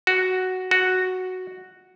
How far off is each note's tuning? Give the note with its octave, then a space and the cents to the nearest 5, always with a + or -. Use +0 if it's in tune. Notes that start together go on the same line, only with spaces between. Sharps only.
F#4 +5
F#4 +0